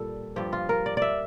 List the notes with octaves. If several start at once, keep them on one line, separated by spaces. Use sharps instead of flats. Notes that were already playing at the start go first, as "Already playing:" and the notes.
Already playing: A#2 G3 A4
G2 F3 G4
F4
A#4
D5
D5 E5